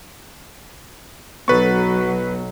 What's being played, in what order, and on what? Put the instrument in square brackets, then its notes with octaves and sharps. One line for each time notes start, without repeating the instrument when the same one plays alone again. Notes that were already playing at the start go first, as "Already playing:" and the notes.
[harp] B1 A6 [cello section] F#3 [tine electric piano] B3 F#4 [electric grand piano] B4 C#6